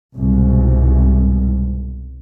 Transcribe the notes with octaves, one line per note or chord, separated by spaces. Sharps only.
C2 G#2 B2